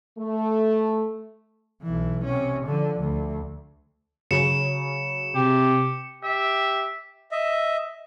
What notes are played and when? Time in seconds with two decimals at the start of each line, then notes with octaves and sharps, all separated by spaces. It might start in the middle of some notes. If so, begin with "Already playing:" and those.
0.18 A3
1.83 B1 E3
2.24 C3 C#4
2.65 D3 F3
3.01 D2
4.31 C#3 F#3 C#5 C#7 E7
5.35 C3 G4
6.23 G4 E5
7.31 D#5 E5